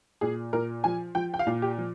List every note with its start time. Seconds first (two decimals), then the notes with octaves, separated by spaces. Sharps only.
0.21 A#2 G#4
0.53 A#2 A#4
0.84 F3 G#5
1.15 F3 G5
1.34 G5
1.39 F5
1.47 A#2
1.62 G4
1.78 F3